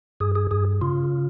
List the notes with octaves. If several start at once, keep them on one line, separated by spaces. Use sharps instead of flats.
G2 G#4
G#4
G2 G#4
C#3 F4